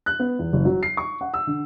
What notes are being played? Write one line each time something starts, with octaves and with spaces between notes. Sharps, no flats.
F#6
B3
E2
F#1
F#3
C7
C#6
F#5
E6
D3